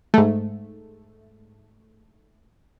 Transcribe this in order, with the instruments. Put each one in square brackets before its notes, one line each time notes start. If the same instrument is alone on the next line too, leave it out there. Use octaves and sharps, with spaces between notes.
[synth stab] G#2 A3